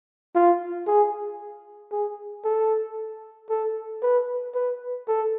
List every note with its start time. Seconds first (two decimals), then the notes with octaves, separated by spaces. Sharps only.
0.35 F4
0.87 G#4
1.92 G#4
2.45 A4
3.50 A4
4.02 B4
4.55 B4
5.08 A4